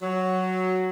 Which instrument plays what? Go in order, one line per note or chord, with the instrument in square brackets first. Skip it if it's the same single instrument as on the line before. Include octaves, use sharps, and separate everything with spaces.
[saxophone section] F#3